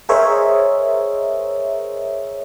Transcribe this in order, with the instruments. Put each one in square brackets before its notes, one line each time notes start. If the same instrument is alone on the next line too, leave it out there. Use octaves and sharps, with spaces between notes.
[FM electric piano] G#4 A#4 C5 C#5 D#5 E5